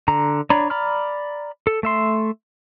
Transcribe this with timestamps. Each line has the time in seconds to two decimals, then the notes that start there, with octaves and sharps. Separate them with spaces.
0.08 D3 A#5
0.50 D4 C#5 D5 A#5 B5
0.70 D5 A#5 B5 F6
1.67 A4
1.83 A3 E5 C6